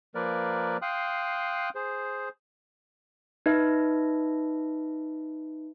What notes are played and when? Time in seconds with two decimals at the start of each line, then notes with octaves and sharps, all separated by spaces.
0.15 F3 A#3 A#4 B4 D5
0.82 F5 G5 C6 D#6 F#6
1.75 G#4 C5
3.46 D#4 B4 E5